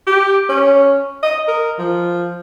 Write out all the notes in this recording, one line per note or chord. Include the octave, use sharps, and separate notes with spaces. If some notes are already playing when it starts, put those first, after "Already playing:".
G4
C#4
D#5
A#4
F3